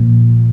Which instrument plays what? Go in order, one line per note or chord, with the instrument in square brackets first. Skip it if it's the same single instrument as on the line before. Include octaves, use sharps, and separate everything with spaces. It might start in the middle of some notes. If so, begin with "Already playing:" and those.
Already playing: [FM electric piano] A#2 F3